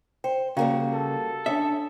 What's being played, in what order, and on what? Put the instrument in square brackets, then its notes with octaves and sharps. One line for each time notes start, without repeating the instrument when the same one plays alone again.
[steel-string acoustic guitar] C5 [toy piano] G5
[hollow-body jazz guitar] C#3 [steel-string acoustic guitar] G3 A#3 F#4 [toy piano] F5 G5 A#5
[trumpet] A4
[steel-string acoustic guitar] C#4 [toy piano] D4 D#6 [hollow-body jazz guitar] E5